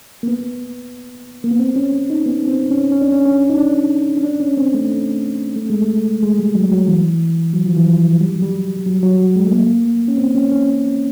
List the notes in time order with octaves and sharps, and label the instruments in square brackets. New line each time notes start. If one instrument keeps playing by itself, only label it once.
[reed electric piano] A#3
B3
A#3
B3
C4
C#4
D#4
B3
C4
C#4
C#4
D4
C#4
C#4
D#4
D4
C#4
D4
C#4
C4
A3
A3
G#3
A3
G#3
G3
F#3
F#3
E3
F#3
F3
E3
F3
G3
F#3
G3
G3
F#3
F#3
G#3
A3
A#3
C#4
C4
C#4
C#4